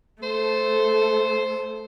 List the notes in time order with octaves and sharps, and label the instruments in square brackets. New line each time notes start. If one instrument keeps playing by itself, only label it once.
[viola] A3 A4 [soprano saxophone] C5